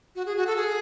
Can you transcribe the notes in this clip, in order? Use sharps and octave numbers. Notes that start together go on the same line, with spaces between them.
F#4
G#4
F#4
A4
G#4